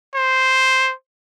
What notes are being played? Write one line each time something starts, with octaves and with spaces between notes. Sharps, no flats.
C5